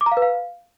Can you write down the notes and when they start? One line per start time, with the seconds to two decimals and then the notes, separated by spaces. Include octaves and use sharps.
0.01 D6
0.06 A#5
0.12 F5
0.17 B4
0.22 F5